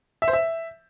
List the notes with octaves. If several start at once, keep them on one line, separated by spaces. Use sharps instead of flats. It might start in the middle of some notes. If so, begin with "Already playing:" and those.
E5
C5
E5